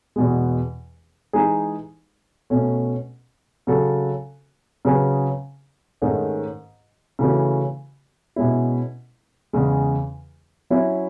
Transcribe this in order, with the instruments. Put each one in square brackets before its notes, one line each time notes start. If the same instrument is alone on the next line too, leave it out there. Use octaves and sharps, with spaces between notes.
[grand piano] E2 B2 G#3
E3 G#3 D#4 G#4
B2 A3 C#4
C#3 F#3 C#4 F#4 A4
C#3 F#3 C#4 G#4 B4
G#2 D#3 A3 C#4 G#4
C#3 E3 A3 C#4 F#4
B2 G#3 C#4 E4
E2 C#3 G#3
F#3 C#4 E4